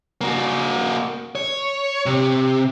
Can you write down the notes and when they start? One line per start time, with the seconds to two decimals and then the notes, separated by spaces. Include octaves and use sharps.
0.21 A#3 F#4
1.35 C#5
2.06 C3